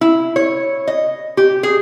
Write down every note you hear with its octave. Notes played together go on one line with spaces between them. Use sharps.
E4
C#5
D#5
G4
G#4